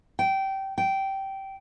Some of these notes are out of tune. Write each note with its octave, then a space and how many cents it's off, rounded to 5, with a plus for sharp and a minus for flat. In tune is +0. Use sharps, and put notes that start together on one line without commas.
G5 -20
G5 -15